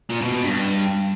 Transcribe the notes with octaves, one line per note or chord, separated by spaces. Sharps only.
A#2
B2
B2
G2